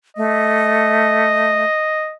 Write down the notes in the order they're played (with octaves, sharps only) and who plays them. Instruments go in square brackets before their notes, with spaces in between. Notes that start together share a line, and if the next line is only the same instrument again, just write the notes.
[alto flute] A3 [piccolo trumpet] D#5